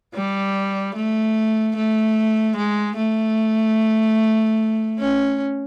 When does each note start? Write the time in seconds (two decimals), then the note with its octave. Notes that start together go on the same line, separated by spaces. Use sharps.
0.15 G3
0.95 A3
1.76 A3
2.57 G#3
2.97 A3
4.99 C#4